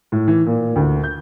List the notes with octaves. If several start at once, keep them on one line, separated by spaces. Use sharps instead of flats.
A2
E3
A#2
D2
G6